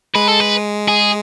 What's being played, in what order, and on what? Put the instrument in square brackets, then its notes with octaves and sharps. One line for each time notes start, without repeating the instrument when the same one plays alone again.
[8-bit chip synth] G#3 [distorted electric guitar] B4
[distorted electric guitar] A4
B4
G#4